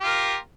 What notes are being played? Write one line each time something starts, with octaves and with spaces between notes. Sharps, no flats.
F4 G4 A#4